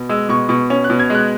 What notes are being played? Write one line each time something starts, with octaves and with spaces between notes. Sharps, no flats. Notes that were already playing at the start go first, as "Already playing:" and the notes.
Already playing: B2
G#3 E6
B2 C#6
B2 C#6
C#4
F#6
B2
G#6
G#3 F#6